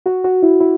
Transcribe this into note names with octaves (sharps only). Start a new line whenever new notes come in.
F#4
F#4
E4
E4